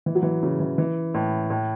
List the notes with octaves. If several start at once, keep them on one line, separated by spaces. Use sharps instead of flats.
E3
F#3
E3
C#3
E3
E3
A2
A2